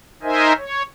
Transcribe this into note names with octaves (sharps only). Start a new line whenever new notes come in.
D#4 A#4 C5 D#5 E5 G#5
C#5